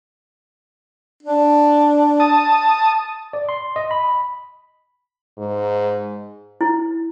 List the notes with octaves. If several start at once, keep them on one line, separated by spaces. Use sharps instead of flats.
D4
A5 D#6
D5
C6
D#5
B5
G#2
E4